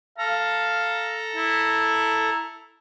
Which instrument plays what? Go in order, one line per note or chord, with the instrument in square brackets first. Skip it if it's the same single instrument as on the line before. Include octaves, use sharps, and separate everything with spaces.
[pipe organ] A4 A#5 [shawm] F5
[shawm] E4